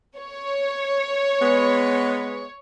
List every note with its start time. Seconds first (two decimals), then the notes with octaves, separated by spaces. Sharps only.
0.17 C#5
1.40 G#3 B3